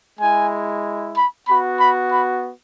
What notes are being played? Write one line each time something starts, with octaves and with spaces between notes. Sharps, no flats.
G#3 E4 G#5
B5
B3 F#4 B5
B5
B5